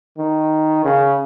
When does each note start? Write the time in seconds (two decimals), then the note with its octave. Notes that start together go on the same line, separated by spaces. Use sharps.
0.18 D#3
0.85 C#3